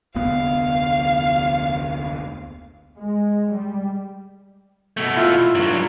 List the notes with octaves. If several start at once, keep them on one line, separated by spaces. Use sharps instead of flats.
F1 D2 B3 F5
G#3
G3
B2 A3
E4 F4
G2 F#3